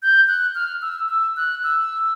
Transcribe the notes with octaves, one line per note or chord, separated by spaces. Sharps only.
G6
F#6
F6
E6
E6
F#6
E6